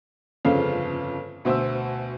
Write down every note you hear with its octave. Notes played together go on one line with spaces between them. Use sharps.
G1 F2 C#3 A4 F5
D2 B2 C5 E5 E6